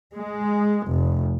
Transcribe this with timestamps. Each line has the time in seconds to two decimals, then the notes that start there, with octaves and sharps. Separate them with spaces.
0.14 G#3
0.87 F1